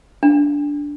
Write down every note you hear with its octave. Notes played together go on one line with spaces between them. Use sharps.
D4